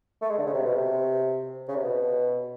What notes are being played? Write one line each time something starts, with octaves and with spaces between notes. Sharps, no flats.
A3
G#3
D3
C#3
C3
B2
C3
C#3
C3
B2